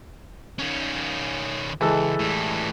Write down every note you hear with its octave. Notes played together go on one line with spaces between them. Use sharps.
D#3 C#4
C#2 E3 G#3 A4
A2 G3